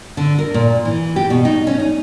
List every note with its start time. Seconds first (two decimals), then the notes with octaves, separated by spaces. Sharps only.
0.17 D3
0.39 A#4
0.54 A#2
0.85 E3
1.16 G4
1.30 B2
1.45 D#4
1.67 C#4
1.79 D#4